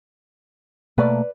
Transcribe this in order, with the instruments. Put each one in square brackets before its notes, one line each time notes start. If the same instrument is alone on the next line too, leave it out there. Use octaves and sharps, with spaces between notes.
[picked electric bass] B2 A3 A#3 [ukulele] B4 D5